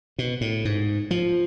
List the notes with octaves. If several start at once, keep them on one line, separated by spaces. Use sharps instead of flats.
B2
A2
G#2
F3